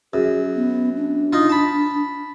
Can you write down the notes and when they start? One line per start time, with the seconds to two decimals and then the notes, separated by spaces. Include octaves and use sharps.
0.14 F#2 G#4
0.56 B3
0.97 D4
1.33 D#4 F4
1.49 A5 B5